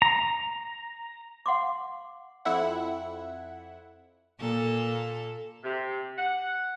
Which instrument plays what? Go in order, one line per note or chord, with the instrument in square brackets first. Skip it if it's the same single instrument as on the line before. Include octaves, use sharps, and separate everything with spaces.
[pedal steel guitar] A#5
[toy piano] F5 F#5 C6 D6
[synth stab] F2 E4 E5 F#5
[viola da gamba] A#2 A#3 A4
[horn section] C3
F#5